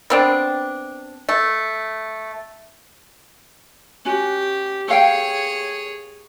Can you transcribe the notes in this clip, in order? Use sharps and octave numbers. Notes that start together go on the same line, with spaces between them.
B3 C4 D4
A3
C#4 F#4 G4
G#4 A4 C#5 F5 G5